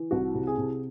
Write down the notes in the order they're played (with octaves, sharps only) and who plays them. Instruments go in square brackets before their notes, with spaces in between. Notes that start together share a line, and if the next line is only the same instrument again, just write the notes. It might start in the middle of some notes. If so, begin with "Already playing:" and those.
Already playing: [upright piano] E3
C2 F#4
C3
G#4
C3